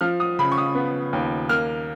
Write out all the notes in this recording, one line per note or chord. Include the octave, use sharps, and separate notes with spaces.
F3 F6
D#6
C#3 B5
C#6
D#6
B3
D#2
A#3 F6